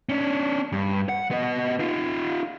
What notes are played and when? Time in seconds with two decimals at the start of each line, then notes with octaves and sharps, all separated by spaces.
0.09 C#4 D4
0.72 G2
1.09 F#5
1.31 B3 D#5
1.79 D#4 F4